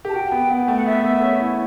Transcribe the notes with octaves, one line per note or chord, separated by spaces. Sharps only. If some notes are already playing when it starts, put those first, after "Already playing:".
G4
A5
F#4 G5
B3
B3
A3
F#5
B3 E5
B3
C#4
E4